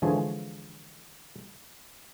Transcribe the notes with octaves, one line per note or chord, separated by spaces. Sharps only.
D3 E3 F3 G#3 C#5